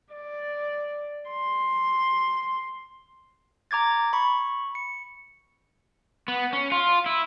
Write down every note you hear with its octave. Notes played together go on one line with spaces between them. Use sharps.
D5
C6
A#5 D6 G#6 A6
B5 C#6
C#7
B3
C#4
F4
E4